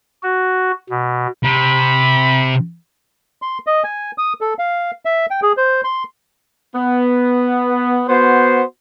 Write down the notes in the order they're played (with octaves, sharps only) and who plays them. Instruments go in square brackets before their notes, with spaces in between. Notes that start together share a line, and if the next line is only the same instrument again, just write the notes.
[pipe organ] F#4
B2
[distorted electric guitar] C3 [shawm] B5
[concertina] C6
D#5
G#5
D#6
A4
F5
E5
G5
G#4
C5
C6
[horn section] B3
B3 F#4 C5